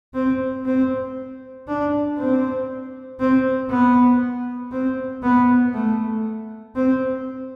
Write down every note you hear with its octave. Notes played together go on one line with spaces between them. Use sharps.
C4
C4
D4
C4
C4
B3
C4
B3
A3
C4